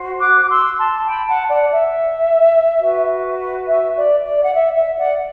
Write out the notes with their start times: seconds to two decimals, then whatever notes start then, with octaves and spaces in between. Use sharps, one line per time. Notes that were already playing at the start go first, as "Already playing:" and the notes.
Already playing: F#4 C5
0.20 D6 F#6
0.42 D6
0.49 C6 E6
0.78 A5 C6
1.06 G5 B5
1.29 F#5 A5
1.50 D5 F#5
1.72 E5
2.81 F#4 B4
3.68 E5
3.96 D5
4.26 D5
4.44 F#5
4.55 E5
4.76 E5
4.98 D5 F#5